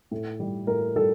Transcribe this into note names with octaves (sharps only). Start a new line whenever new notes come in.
A2
G3
A2 A#4
G3 A4